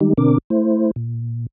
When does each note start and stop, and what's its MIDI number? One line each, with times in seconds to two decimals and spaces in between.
0.01 0.13 51
0.01 0.13 55
0.01 0.13 56
0.01 0.13 63
0.01 0.13 67
0.18 0.38 47
0.18 0.38 50
0.18 0.38 60
0.18 0.38 62
0.18 0.38 70
0.18 0.38 86
0.50 0.91 57
0.50 0.91 64
0.50 0.91 72
0.96 1.46 46